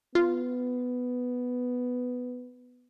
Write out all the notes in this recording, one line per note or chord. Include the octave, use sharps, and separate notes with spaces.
B3 F4